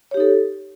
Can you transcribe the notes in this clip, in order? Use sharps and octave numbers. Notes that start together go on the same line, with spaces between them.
D#4 G4 A4 C#5